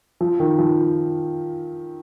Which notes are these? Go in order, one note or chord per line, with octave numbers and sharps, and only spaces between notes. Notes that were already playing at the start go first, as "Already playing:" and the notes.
F3
D#3
F3